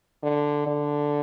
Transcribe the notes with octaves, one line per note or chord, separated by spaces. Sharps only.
D3
D3